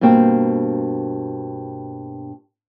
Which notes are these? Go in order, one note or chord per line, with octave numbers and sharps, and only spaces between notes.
G2 B2 A#3 C4